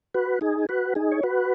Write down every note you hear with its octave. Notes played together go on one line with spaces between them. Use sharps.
F#4 B4
D#4 G#4
F#4 B4
D#4 G#4
C#5
F#4 B4